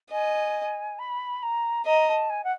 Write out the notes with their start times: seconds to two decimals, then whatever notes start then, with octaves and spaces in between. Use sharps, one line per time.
0.11 D#5 G#5
0.98 B5
1.42 A#5
1.85 D#5 A#5
2.08 A5
2.29 G#5
2.44 F#5